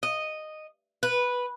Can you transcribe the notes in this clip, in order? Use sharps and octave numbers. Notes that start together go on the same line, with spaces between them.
D#5
B4